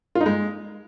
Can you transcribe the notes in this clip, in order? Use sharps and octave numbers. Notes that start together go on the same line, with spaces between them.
F4
D#4
G#3